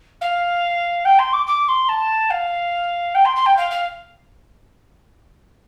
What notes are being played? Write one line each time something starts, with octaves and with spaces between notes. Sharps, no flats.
F5
G5
C6
D6
D6
C6
A5
F5
G5
C6
C6
G5
F5
F5